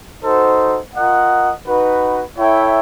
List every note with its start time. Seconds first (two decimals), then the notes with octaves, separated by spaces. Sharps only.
0.22 D#4 F#4 A4 C5
0.94 F4 A#4 D#5 F#5
1.66 D#4 F#4 B4
2.38 E4 A4 C#5 E5 G5